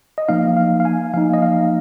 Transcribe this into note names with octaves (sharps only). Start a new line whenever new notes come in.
D#5
F3 A#3 D#4 F5
F5
F5
G#5
F3 A#3 D#4 F5
D#5
F5